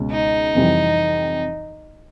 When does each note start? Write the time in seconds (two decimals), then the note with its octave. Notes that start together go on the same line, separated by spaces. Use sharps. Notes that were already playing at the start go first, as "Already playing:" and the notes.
Already playing: C#2 B2 G#3 C#4
0.11 D#4
0.55 F2 C3 E3 G3